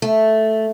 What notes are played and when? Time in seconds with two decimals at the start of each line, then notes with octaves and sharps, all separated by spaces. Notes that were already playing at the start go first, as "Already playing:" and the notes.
0.02 A3